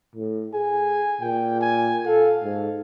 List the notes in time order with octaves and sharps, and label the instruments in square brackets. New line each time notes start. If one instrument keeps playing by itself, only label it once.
[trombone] A2
[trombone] G#4 [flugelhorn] G#5
[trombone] A#2 [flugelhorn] G5
[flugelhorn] G#5
[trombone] A4 [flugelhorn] F5
[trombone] G#2